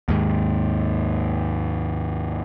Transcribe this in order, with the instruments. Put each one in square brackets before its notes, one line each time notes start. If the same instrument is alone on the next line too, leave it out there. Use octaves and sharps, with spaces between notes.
[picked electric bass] D#2 G#2